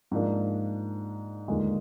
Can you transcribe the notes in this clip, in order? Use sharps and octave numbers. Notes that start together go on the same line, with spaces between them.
G#2 F3 A#3 D4
D#2 D3 F3 G#3